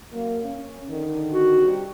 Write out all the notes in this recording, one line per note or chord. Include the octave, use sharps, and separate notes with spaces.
F#2 F#3 A#3
C#4
D3 D#3
F#4
C3 G3 G4